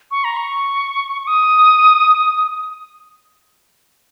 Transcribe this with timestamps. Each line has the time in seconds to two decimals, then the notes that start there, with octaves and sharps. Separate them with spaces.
0.11 C#6
0.24 A#5
0.37 C#6
1.22 C#6
1.27 D#6